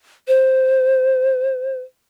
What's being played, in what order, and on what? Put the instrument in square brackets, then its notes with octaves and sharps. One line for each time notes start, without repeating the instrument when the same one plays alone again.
[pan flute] C5